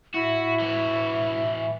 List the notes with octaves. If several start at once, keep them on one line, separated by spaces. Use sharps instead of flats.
A2 E4 F#4 E5
E3 F#4